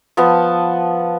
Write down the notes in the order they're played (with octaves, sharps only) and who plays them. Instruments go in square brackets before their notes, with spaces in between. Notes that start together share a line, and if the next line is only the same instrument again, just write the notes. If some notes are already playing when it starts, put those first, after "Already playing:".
[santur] F3 B3 A5